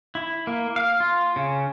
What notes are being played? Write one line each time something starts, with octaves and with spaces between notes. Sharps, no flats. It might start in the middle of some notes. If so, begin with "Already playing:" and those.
E4
A#3
F5
F4
C#3